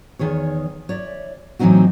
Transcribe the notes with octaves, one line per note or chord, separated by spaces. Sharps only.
E2 D#3 G#4 C#5
C#5 D5 E5
A2 E3 F#3 C4 D#4 F#4